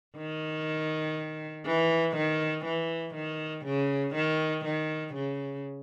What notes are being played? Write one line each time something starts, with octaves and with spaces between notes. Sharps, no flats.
D#3
E3
D#3
E3
D#3
C#3
D#3
D#3
C#3